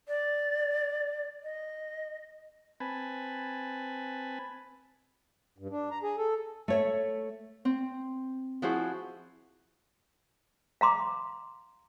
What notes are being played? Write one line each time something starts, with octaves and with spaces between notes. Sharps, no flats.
D5
D#5
C4 B4 G#5 A5 B5
G2
D4
A#5
G#4
A4
A3 C#5 E5
C4
F3 E4 F#4 G#4 C5
F5 A#5 C6 D6